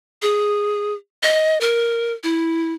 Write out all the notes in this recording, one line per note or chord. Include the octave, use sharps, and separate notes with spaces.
G#4
D#5
A#4
E4